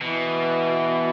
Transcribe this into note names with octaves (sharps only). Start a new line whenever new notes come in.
B2 E3